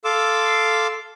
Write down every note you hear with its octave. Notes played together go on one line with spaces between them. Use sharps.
A4 F5 C6 D6 E6